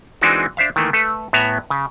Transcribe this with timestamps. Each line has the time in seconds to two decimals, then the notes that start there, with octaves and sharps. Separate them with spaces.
0.21 E3 G#3 C4 D4 D#4 F#4
0.57 D4 C5 E5 F5
0.76 D#3 E3 A3 A#3
0.93 A3 A4 B4
1.33 A2 B3 E5 G#5 A#5
1.70 C#3